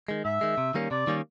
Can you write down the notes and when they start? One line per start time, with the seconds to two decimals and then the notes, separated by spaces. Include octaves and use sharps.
0.08 D#3 G#3
0.25 G#2 E5
0.41 D#3 G#3
0.58 C3
0.74 D#3 G3 A#3 C#4
0.91 C3 D5
1.07 D#3 G3 A#3 C#4